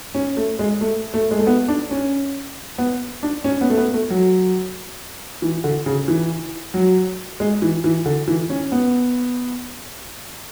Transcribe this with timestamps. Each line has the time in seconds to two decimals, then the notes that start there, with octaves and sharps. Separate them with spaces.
0.14 C#4
0.37 A3
0.59 G#3
0.81 A3
1.14 A3
1.31 G#3
1.39 A3
1.47 B3
1.68 D4
1.91 C#4
2.78 B3
3.23 D4
3.44 C#4
3.61 B3
3.70 A3
3.77 B3
3.94 A3
4.10 F#3
5.42 E3
5.64 D3
5.86 C#3
6.08 E3
6.74 F#3
7.40 G#3
7.62 E3
7.84 E3
8.06 D3
8.28 E3
8.50 C#4
8.72 B3